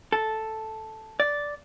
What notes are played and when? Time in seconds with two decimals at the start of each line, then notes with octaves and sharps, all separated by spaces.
0.12 A4
1.20 D5